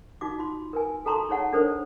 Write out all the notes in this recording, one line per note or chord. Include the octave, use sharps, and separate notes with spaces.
D#4 F#4 D6
F4 C6
A#4 B4 G#5
F#4 A4 A5 A#5 C6 C#6
D#4 G#4 C#5 F#5 A5
D4 A4 A#4 C5 C#5